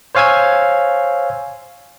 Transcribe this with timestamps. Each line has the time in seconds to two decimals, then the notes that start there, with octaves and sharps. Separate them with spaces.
0.15 C5 C#5 F5 G#5 E6 G#6